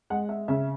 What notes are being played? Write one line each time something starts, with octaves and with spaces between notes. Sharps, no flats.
G#3 F#5
E5
C#3 E5